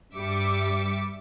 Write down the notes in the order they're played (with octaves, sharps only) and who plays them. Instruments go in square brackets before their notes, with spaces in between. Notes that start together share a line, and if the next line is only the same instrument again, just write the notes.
[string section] G2 G3 E5 D6 C#7